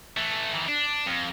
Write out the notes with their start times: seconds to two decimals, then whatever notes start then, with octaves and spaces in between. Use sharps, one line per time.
0.17 E3 A3
0.54 D#3 E3
0.68 D4
1.07 F2